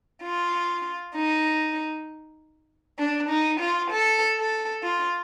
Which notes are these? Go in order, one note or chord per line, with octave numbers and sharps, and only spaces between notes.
F4
D#4
D4
D#4
F4
A4
A4
F4